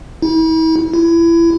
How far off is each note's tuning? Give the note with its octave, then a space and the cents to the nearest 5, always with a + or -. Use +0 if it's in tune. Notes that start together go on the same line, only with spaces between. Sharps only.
E4 -40
E4 +25